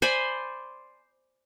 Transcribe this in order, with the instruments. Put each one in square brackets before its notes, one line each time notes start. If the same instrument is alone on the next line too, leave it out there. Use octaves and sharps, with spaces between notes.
[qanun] C5 D5 G#5 B5